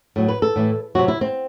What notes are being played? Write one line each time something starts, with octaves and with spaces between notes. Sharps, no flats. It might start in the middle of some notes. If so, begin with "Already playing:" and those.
A2 F#3
B4
A4
A2 E3
C3 F#3 F#4
E4
C4